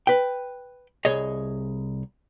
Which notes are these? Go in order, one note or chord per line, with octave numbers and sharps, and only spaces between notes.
B4 G5
C2 G#4 C#5 D#5